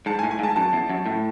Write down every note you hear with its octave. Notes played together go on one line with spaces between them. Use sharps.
G#2 A5
G#5
A2
G#5
G#2
A5
F#2 A5
E2
F#2
A2